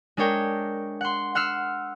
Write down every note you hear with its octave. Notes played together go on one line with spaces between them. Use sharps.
G#3 D4 A#4 C#5 G5
F#5 C6
F#5 E6 F6 C7